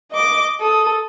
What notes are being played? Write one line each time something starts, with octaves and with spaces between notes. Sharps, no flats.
D#5 D6
A4 D#6